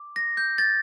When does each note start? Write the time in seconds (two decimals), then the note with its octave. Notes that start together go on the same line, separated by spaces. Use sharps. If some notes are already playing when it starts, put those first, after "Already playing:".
Already playing: D6
0.16 A#6
0.37 G6
0.58 A6